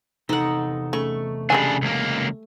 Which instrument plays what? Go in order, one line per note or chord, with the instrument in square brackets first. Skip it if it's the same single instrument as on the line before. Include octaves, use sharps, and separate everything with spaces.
[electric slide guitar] E2 C3 A4 [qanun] D#4 F#5
[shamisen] C#3 [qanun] A3 C#6
[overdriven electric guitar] C#3 D4 [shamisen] G3 G#3 G#5
[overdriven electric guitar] C#2 A#3